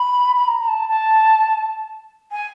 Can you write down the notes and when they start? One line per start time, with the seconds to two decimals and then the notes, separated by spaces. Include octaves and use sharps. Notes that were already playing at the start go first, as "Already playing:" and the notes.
Already playing: B5
0.35 B5
0.47 A#5
0.60 A#5
0.68 A5
0.88 A5
2.31 G#5